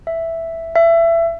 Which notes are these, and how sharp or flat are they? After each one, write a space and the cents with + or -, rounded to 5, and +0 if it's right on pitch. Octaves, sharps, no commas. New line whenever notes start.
E5 +0
E5 +25